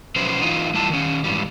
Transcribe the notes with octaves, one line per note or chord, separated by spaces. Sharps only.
B2 F3 F#3 C#4 B4 C5
E3 D#4 F4
F2 G3 E4 A5
D#3 C#4
G#2 E3 G3